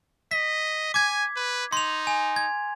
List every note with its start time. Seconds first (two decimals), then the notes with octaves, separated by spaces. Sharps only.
0.31 D#5 B6
0.94 G#5 D6 G#6
1.36 B4
1.72 D#4 C6 F7
2.07 G#5
2.36 G#6